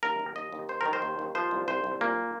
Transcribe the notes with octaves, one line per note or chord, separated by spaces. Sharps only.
D#2 A#4
D#2
D#2 D#5
D#2
D#3 C5
D#3 A#4
C5
D#2
D#2
F3 C5
C2
C2 C5
C2
A#2 A#3